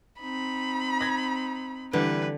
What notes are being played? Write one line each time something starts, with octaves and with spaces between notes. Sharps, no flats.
C4 D#4 B5
G#6 A#6
D3 E3 G3 B4